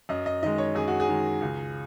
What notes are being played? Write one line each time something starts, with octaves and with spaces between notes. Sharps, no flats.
F#2 D#5
D#5
D#3 G#3 D#5
C#5
F#2 G#4
F#4
G#4
D#3 G#3
C#2